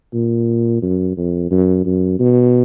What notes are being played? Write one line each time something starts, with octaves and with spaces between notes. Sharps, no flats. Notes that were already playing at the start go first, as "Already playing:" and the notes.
A#2
F#2
F2
F#2
F#2
B2